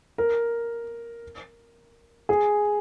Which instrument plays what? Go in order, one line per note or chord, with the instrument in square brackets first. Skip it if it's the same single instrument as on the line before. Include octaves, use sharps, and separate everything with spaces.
[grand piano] A#4
G#4